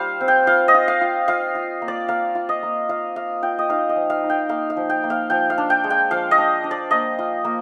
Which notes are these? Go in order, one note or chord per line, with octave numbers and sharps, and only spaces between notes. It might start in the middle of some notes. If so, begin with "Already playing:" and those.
Already playing: G3 F4 C5 F5
C4
G5
F4 F5
D#5
F4
F5
F4
F4 F5
F4
A#3
D5
A#3 F5
F4
D#5
A#3
F4 F5
F4 F5
F4 G5
D#5
D#4 F5
D#5
F3
F5
D#4
G5
A#3 F5
F5
F3
G5
A#3
F5
F3 G5
F5
D4
G5
G#3
G5
F3 F5
D#5
D4
D4
D5
A#3 D#5
F4
A#3